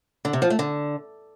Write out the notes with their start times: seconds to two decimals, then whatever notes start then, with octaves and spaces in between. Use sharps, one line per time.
0.25 D3
0.33 C3
0.42 F3
0.50 A3
0.59 D3